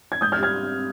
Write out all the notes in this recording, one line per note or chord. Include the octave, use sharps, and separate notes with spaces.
G#6
G#2 D#6 G6
F6 G#6
G3
F6 G#6